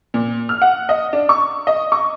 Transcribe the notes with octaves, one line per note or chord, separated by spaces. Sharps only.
A#2
F6
F#5
D#5
D4
C#6
D#5
C#6